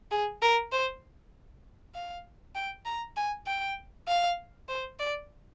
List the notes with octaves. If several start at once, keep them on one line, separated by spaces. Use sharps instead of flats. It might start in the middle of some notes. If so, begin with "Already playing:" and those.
G#4
A#4
C5
F5
G5
A#5
G#5
G5
F5
C5
D5